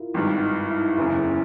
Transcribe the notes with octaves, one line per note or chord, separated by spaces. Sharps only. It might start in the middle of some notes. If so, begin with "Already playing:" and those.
Already playing: E4 F4 A#4
G#1 G2 D#3 D#4
D#4
E4
F#1 E2 C#3 E4